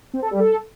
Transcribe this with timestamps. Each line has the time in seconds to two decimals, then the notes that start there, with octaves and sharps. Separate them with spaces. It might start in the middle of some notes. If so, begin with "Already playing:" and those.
0.14 C4
0.22 A4
0.31 G3
0.40 A4